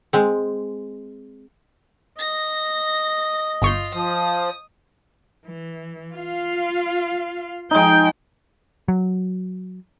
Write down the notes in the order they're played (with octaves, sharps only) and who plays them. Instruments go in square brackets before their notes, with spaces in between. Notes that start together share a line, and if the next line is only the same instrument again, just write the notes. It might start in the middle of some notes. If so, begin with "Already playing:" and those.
[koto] G#3 C4
[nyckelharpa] D#5 [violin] A#6
[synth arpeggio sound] G1 C#6 G6 [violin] F4
[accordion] F3 [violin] D#6
[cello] E3
F4 F5
[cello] F3 G5 [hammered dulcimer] G#3 D#4
[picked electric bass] F#3